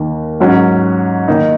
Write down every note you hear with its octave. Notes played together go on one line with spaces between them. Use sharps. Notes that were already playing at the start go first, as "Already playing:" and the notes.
Already playing: D#2 D#3 A#3
G#2 F#3 C#4
D#3 A#3 D#4